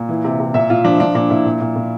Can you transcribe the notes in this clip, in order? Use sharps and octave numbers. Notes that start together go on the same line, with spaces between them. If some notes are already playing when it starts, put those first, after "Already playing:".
Already playing: A#2
E3
C3
C3
A#2 E5
A#2 F4
F3 D4
F3 D4
A#2 D4
A#2 E4
A#2
A#2
A#2